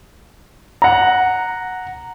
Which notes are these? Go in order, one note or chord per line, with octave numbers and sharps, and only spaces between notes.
F#5 A#5